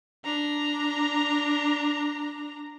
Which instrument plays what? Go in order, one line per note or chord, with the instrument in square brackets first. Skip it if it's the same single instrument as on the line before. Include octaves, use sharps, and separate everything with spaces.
[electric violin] D4 A#5